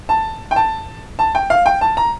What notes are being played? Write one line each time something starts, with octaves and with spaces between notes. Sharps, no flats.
A5
G5
A5
A5
G5
F5
G5
A5
A#5